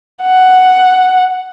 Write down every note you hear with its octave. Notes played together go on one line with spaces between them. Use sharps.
F#5